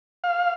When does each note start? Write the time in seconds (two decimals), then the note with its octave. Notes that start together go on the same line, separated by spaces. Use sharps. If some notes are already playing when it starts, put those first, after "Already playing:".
0.24 F5